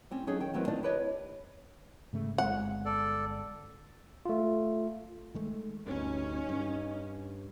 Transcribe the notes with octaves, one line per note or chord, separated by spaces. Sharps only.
G3 C4 C#4
F#3 C#4 D#4 G#4 A4
D#3 G5
D#3 F#3 A#3 C4 E4 B4
D4 D#4 F4 D5 D#5
E4 G4 B4 C#5 D#5
G#2 C#3 A3
G1 G#3 C4 F#5
A4 D5
A3 F4
D#3 G#3 A3
D2 G2 C#4 D#4
G2